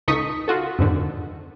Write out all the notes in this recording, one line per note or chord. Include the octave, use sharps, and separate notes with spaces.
C#2 D#4 A4 C#6 D#6 B6
F4 F#4 A4
F2 G#2 D3 D#3